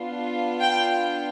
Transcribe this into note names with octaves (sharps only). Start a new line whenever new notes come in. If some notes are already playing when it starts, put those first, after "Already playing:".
Already playing: B3 D4 F4
G5